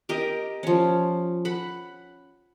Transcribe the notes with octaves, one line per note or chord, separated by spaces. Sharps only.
G4 A#4 D#5
F3 C#4
F#5 B5